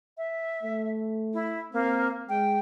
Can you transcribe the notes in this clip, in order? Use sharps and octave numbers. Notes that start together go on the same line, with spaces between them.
E5
A3
E4
A#3 C4
G#3 G5